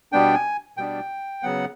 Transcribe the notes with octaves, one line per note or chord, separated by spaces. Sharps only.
B2 G3 B3 D4 G5
G#5
B2 G3 B3 D4 G5
C#3 F#3 B3 F#5